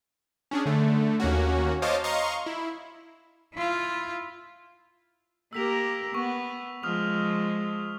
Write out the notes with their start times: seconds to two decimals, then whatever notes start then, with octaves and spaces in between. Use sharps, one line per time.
0.51 C#4 D4 G#4
0.66 D3 A3
1.20 D#2 A#3 C#4 F#4
1.82 C5 C#5 D#5 F5 A5 D6
2.04 D#5 F5 A#5 C6 C#6
2.46 E4
3.54 E4 F4
5.53 A#3 G4 A#4 E6 B6 F7
6.14 B3 C#6
6.83 F3 G#3 D#6 F6 F7